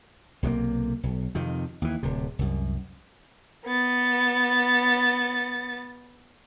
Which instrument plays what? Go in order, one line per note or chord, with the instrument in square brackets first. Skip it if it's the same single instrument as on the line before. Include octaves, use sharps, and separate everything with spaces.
[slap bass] B1 C3 G#3 A#3
B1
F2 C3 D#3
D#2 E3
D1 C3
C2 F#2
[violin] B3 A6